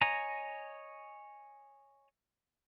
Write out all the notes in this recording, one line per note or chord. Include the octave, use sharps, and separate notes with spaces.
C#5 D#5 G#5 A#5